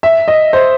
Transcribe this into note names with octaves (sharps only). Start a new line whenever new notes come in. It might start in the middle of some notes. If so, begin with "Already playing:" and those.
E5
D#5
C5